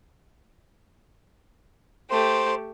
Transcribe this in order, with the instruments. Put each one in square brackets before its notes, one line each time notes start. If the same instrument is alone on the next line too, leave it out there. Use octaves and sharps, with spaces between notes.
[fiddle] A3 G4 [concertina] C5